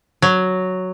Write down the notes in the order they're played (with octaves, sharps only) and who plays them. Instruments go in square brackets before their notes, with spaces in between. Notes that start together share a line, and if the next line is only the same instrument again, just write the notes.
[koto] F#3